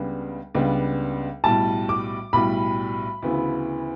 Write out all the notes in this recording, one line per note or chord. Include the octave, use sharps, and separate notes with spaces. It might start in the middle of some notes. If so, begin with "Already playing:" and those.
Already playing: C#2 C#3 G3 B3 D4
C#2 C#3 G3 B3 D4
B1 A2 G3 A5
D6
B1 A2 G3 B5
D2 C#3 E3 B3 E4